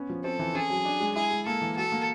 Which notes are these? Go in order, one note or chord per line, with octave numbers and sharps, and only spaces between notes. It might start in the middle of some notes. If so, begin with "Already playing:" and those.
Already playing: B3 C#4
F3
C4 A4
E3
C#4 G#4
F#3
D4
G#3
E4 G#4
G#3
A#3 A4
E3
F#4 A4
A#3